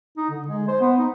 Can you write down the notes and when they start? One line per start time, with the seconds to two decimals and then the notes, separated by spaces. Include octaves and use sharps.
0.17 D#4
0.30 D3
0.48 G#3
0.68 C5
0.81 B3
0.98 D#4